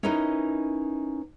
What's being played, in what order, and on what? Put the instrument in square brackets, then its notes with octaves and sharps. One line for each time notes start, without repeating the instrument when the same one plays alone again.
[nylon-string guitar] C#4 D#4 E4 A#4 B4 D#5